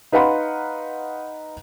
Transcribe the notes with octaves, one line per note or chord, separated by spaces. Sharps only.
D#4 B4 F5 F#5 B5 C6